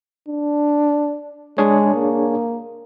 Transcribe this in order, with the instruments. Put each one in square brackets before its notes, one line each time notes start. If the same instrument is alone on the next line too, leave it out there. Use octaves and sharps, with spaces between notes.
[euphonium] D4
[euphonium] G#3 [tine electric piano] D4 G#4 C#5
[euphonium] A#3